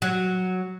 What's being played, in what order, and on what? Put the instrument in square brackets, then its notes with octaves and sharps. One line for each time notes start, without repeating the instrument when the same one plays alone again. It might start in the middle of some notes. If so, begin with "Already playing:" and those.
[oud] F#3